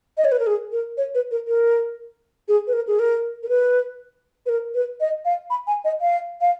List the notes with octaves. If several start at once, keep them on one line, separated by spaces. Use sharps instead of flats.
D#5
C#5
B4
A#4
G#4
A#4
C#5
B4
A#4
A#4
G#4
B4
A#4
G#4
A#4
A#4
B4
B4
A#4
B4
D#5
F5
B5
G#5
D#5
F5
F5